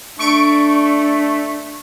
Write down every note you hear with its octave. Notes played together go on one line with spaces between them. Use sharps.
A3 D4 C#6 D7